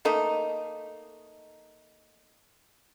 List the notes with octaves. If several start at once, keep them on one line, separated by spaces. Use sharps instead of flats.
A3 A#3 D#4